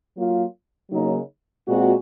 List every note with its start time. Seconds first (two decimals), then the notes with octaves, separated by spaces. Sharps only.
0.16 F#3 A#3 F4
0.91 C#3 F#3 A#3 D#4
1.67 A#2 G#3 C4 F#4